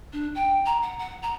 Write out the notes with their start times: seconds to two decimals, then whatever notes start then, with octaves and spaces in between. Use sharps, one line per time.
0.12 D4
0.35 G5
0.65 A#5
0.82 F#5
0.99 F#5
1.22 A#5